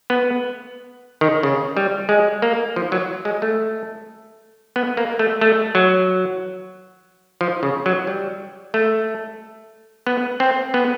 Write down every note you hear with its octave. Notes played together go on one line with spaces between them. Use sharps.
B3
D#3
C#3
G3
G#3
A#3
F3
F#3
G#3
A3
B3
A#3
A3
A3
F#3
F3
C#3
F#3
G3
A3
B3
C4
B3